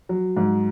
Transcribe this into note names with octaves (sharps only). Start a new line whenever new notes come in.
F#3
G#2